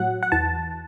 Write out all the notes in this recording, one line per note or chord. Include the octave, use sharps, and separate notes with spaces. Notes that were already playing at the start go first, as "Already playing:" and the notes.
Already playing: A2 F#3 F#5
F#5
E2 E3 A5